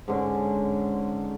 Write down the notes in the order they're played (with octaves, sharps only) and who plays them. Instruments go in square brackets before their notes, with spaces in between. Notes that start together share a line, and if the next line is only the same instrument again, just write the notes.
[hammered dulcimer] G#2 D3 C#4